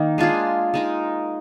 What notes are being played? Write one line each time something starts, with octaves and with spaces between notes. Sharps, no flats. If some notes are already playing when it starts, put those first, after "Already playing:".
Already playing: D#3 A#3 D#4
G#3 D4 F4 G#4
G#3 D#4 A#4